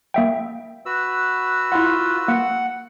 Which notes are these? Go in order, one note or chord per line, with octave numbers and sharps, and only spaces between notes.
A#3 E5 G5
F#4 B4 E6
E4 F4 F#5
A#3 F#5